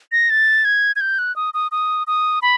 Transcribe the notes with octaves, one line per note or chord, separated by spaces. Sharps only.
A#6
A6
G#6
G#6
G6
F#6
D#6
D#6
D#6
D#6
B5